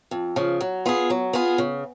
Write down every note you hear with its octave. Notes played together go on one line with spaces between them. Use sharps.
F2
C#3 F3
F#3
B3 F4 G#4
F#3
B3 F4 G#4
C#3